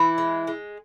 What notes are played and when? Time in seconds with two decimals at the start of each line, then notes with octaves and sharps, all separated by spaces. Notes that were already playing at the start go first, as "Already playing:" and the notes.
Already playing: E3 E4
0.18 G#3
0.47 G#3